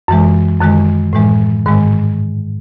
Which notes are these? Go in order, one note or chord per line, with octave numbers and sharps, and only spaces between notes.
F#2 E3 G#3
F#2 D#3 G#3
A2 E3 G#3
G#2 D#3 G#3